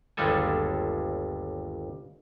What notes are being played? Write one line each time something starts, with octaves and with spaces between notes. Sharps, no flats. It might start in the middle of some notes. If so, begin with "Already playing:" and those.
G1 D#2 G3 G#3 A4 G#5